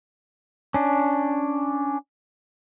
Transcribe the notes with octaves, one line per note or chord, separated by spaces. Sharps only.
C#4 D4